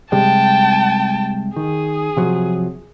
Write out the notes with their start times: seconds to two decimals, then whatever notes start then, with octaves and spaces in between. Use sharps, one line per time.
0.12 C3 G3 G#3 G5 A5
1.56 D#3 G#4
2.17 C3 F3 F#3